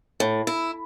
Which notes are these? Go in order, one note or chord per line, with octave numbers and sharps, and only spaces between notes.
A2
E4